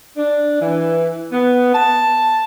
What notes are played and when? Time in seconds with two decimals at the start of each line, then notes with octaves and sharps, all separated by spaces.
0.17 D4
0.61 E3
1.31 B3
1.74 A5